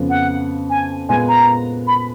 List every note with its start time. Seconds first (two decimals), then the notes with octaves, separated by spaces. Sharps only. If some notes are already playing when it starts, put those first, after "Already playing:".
Already playing: F2 C#3 F3 B3
0.10 F#5
0.70 G#5
1.09 A#2 G#3 B3 G#5
1.28 A#5
1.87 B5